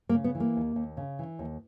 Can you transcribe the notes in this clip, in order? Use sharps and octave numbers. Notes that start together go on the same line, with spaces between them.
A#3
C#3
B3
E3
A#3
D#2
D#2
C#3
E3
D#2